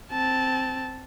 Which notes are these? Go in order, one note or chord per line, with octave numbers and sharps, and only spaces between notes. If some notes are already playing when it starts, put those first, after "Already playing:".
C4 A5